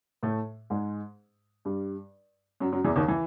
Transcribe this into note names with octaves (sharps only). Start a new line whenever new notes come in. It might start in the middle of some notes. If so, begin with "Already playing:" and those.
A2 A3
G#2 G#3
G2 G3
F#2 F#3
F#2 F#3
E2 E3
D#2 D#3
E3